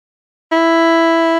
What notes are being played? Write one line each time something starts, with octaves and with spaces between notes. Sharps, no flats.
E4